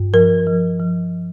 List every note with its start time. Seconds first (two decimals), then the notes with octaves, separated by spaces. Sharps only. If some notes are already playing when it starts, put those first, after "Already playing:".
Already playing: G2
0.14 F3 A#4
0.47 F3
0.79 F3